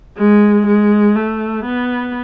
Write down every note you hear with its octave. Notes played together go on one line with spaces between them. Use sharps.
G#3
G#3
A3
B3